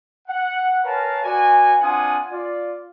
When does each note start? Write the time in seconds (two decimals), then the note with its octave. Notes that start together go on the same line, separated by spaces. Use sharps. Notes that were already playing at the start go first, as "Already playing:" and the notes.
0.28 F#5
0.84 A#4 B4 C#5 F5 G#5 A5
1.24 F#4 B4 D5 G#5
1.80 C4 D4 F4 F#5 G#5 D#6
2.30 F4 D5